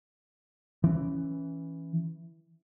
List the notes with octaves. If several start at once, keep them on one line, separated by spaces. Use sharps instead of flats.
E3 C#4